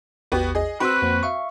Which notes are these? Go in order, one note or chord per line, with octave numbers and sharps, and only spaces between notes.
A1 E2 B3 F#4 G4
G#4 D#5
C4 F#4 B4 B5 C6 E6
F2 A#3 C5
E5 F5 C#6